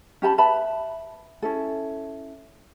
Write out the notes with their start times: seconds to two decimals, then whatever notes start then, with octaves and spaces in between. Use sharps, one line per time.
0.22 C#4 G4 A5 B5
0.38 B4 E5 A5 B5
1.42 C#4 E4 A4